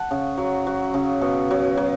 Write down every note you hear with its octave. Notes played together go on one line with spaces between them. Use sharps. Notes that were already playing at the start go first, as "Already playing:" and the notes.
Already playing: F#5 A5
C#3
F#3
F#3
C#3
B2
F#3
F#3